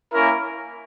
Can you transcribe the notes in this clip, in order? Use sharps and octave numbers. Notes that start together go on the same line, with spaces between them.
A#3 C#4 E4 A#4